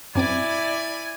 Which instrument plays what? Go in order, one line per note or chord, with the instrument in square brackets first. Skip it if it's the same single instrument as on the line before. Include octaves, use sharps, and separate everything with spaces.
[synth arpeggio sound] F#2 C4 D6 [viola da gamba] E4 D5 [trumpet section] G#5